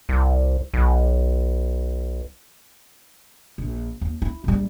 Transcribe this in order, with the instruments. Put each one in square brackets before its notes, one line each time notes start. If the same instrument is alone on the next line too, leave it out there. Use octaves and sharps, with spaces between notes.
[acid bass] C2
B1
[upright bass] A#1
D#2
E4
A#1 G3